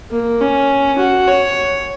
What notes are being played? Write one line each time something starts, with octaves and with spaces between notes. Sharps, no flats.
A#3
C#4
F#4
C#5